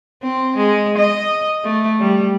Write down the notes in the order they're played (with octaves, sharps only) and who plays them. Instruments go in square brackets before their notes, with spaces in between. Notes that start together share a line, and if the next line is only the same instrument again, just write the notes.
[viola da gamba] C4
G#3
D#5
A3
G3